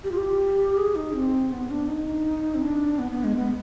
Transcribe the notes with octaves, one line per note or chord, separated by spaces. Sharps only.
G4
F4
G4
G#4
D#4
C4
B3
D4
D#4
C4
D4
B3
B3
G#3
B3